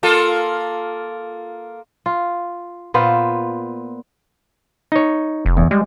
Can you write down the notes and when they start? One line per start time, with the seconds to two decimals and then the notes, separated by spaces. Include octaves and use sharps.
0.03 A#3 F4 A4
2.06 F4
2.94 A#2 B3 F4 C5
4.92 D#4 C#5
5.46 F1
5.57 E2
5.71 G3 G#3